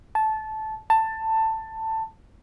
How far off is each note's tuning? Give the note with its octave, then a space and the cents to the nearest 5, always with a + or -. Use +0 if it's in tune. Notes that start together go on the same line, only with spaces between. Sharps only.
A5 -15
A5 +15